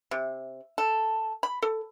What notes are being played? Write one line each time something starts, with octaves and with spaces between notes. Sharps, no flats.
C3
A4
B5
A4